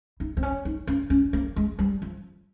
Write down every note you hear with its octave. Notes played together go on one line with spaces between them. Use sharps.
D#4
C4
C#4
D#4
C#4
C#4
A#3
G#3
G3
F3